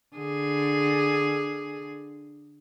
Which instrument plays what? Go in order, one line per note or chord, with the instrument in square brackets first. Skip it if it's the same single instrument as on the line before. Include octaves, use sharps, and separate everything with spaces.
[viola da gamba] D3 G#4